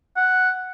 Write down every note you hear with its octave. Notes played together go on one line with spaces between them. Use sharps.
F#5